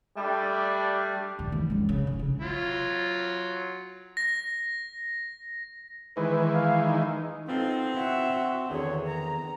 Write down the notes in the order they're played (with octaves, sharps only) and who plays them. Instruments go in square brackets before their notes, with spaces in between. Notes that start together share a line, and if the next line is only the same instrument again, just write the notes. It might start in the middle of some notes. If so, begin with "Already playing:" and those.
[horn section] G3 A3 D4
[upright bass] A#1 D#2
D#2 E3
F#2 G#3
C#3
C#3
C#3
[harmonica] F#3 F4
[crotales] A#6
[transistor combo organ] D#3 E3 G#3 [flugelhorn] B4
[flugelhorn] F5
D#4
[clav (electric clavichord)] B3 F4 A4 [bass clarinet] C4 [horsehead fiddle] D#4
[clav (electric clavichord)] E4 F#4 [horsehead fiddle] E5 F#5
[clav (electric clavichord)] F#4
[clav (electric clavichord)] E2 D3 [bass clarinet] D#3 [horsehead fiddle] G#4 C#5
[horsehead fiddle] A#5